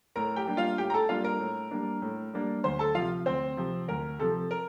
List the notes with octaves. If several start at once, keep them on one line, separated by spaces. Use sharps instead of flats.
A2 A#4 A#5
G4 G5
G3 A#3 D4
F4 F5
A2 G4 G5
A#5
A4 A5
G3 A#3 D4 F4 F5
A#4 A#5
A2
G3 A#3 D4
A2
G3 A#3 D4
D2 C5 C6
A4 A5
C3 F3 F4 F5
D2 C4 C5
C3 F3
D2 A#4
C3 F3 A4
A#4